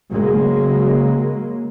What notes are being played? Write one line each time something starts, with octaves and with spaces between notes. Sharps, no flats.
C#3 F#3 G#3 A#3